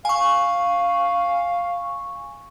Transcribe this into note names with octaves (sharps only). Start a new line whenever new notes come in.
F5 G#5 C#6